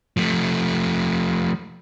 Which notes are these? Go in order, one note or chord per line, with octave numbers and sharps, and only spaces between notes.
F3 A3